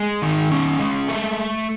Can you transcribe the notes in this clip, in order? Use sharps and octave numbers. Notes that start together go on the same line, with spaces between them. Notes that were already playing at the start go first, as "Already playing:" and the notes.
Already playing: G#3
D#3
C#4
G#3
A3